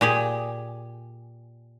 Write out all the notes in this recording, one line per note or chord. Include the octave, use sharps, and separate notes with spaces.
A#2 G4 G#4